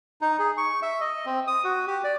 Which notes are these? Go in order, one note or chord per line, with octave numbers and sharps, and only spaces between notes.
D#4
G#4
C#6
E5
D#5
C4
D#6
F#4
G4
D5